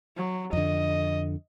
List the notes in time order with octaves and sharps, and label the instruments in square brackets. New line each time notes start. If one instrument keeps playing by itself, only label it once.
[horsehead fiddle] F#3
[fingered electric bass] F2 D3 [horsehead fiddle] D#5